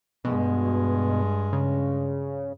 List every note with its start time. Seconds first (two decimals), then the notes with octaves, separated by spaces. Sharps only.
0.25 G2 B2 G#3
1.53 C#3